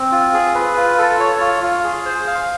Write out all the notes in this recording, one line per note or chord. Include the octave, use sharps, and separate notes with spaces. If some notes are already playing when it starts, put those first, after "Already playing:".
Already playing: C4
F4
G#4
B4
F4
A4
C#5
F4
F4
G#4
C5
F5